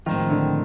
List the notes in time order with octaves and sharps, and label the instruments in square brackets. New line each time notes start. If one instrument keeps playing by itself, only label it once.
[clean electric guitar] A2 F3 G#3 C4 F4 [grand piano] D#3
[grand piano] D3